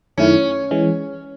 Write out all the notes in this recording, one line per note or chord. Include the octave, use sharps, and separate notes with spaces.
F#2 D#3 A3 C#4 E4
E3 G#3 C#4